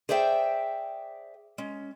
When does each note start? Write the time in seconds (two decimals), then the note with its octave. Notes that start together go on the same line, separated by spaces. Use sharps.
0.09 G#4 C5 D5 E5 G5
1.58 G#3 C#4